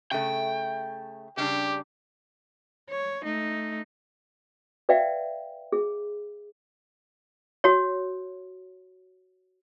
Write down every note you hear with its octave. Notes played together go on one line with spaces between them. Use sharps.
C#3 A3 G5
C#3 G3 D4 G4
C#5
A3 D#4
B4 D5 E5 F5 G5
G#4
F#4 C#5